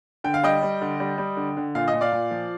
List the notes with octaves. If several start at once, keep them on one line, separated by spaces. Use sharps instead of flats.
D3 G5
F5
G3 D#5 G5
G3
D3
G3
G3
D3
D3
A#2 F5
D#5
A#2
D5 F5
A#2
F3